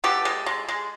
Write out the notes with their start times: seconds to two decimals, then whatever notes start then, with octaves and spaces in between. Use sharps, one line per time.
0.04 B3 G4 A4
0.25 G#3
0.46 G#3
0.69 G#3